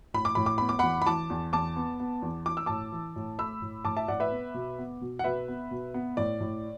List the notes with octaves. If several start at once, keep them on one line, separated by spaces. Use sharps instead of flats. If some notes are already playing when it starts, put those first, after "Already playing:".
A2 B5
D6
A2 B5
D6
B3 B5
D6
E2 F#5 B5
B5
E3 A5 D6
E2
E2 A5 D6
B3
B3
E2
E3 D6
E6
A2 A5 D6
E3
A2
A3 B5 E6
A2
A2 A5 D6
E5 A5
A2 D5 F#5
B4 E5
B3
B2
B3
B2
F#5
B2 B4 E5
B3
B2
B3
A2 D5
A2